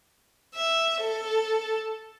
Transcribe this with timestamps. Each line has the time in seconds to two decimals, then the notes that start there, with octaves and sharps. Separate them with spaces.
0.55 E5
1.01 A4